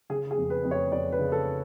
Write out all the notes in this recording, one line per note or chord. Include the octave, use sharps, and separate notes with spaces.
C#3 G#4
G#4
F2
B4
F2
C#5
F2 D5
B4
C#3
A4